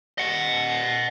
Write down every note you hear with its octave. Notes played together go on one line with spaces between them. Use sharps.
D#5 F#5